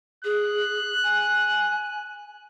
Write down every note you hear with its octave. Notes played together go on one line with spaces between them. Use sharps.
G#4 F#6
G#5